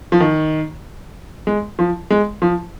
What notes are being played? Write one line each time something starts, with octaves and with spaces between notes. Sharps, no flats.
F3
D#3
G#3
F3
G#3
F3